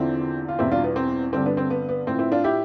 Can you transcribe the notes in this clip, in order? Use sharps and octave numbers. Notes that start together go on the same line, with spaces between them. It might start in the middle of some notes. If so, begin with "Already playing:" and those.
Already playing: E2 D3 F3 C4 E4
F4
E2 B2 G3 C4 E4
D4 F4
B3
C4
G2 D3 G3 C4
B3 D4
C4
B3
B3
A2 F3 C4
C4 E4
D4 F4
E4 G4